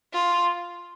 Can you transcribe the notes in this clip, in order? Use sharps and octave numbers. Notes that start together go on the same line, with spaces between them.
F4